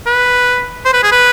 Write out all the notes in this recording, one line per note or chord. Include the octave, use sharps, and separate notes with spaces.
B4
C5
B4
G#4
B4